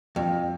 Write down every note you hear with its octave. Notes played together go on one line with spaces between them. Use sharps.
F2